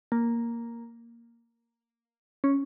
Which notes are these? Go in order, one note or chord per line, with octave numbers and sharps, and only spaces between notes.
A#3
C#4